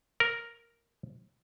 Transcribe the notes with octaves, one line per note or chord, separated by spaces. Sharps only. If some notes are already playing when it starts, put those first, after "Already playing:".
A#4